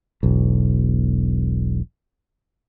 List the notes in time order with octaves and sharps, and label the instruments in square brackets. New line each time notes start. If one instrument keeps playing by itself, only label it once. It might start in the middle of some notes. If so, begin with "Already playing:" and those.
[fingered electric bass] E1 B1